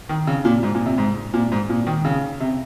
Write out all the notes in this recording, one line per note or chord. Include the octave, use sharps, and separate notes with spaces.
D#3
C#3
A#2
G#2
A#2
C3
G#2
A#2
G#2
A#2
D#3
C#3
C3